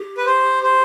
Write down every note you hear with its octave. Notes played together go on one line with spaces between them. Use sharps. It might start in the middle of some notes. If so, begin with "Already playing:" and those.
Already playing: G4
B4
C5
C5